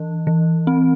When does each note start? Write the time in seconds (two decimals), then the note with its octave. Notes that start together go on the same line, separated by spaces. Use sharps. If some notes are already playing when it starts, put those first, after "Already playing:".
Already playing: E3
0.27 E3
0.67 C4